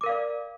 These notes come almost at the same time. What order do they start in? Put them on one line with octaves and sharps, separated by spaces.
D6 A#4 F5 D5